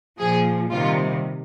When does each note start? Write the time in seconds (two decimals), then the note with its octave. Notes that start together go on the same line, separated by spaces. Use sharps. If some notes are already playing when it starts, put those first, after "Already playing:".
0.19 A#2 F3 G#4
0.70 C3 D#3 G3 F4